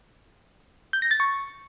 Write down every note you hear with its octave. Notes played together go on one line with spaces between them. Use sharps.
G6
A#6
A6
C#6